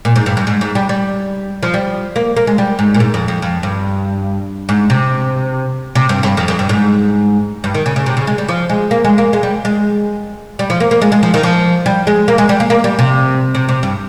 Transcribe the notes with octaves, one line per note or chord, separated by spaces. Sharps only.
A#2
G#2
G2
G2
G#2
G#2
G3
G3
F3
G3
A#3
A#3
G#3
G3
G#2
A#2
G#2
F2
F2
F2
G2
G#2
C3
C3
G2
G2
F2
F2
G2
G#2
G2
D#3
C#3
C#3
C3
C#3
G#3
G3
F3
G#3
A#3
G#3
A#3
G#3
G3
G#3
G3
F3
A#3
A#3
G#3
G#3
F3
D#3
F3
G3
G#3
A#3
G#3
G3
A#3
A#3
G3
C3
C3
C3
G2